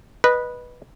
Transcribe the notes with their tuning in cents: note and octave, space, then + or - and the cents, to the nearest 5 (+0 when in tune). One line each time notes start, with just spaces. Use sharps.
B4 -10 D#5 -15